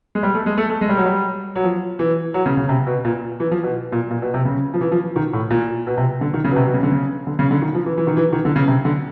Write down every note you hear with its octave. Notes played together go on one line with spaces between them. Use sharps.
G#3
G3
A3
G#3
A3
A3
G#3
G3
F#3
G3
F#3
F3
E3
F#3
C#3
C#3
C3
B2
A#2
E3
F3
B2
A#2
A#2
B2
C3
C#3
F3
E3
F3
D#3
A2
A#2
B2
C3
D3
D#3
C#3
B2
C3
B2
C#3
D3
C#3
D3
C#3
D3
D#3
F3
E3
E3
D#3
E3
D#3
D3
C#3
C3
D3